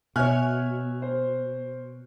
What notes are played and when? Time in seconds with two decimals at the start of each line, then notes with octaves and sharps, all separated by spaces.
0.16 B2 C#5 E5 G#5 F6 F#6
1.02 C5